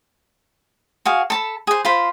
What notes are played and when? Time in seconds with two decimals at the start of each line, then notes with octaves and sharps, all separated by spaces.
1.06 F#4 G#4 F5
1.30 A4 A5 B5
1.67 G#4 C5
1.85 F4 C5 B5